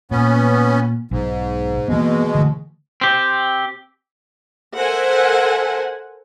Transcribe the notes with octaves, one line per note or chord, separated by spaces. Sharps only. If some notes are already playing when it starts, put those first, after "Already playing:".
A#2 B3 C#4
B1 G#2
B2 E3 G#3 A#3 B3
D3 E3 A3
C4 G4
A4 A#4 C5 E5 F#5 G#5